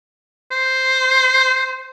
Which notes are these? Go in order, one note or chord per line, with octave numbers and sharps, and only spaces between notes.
C5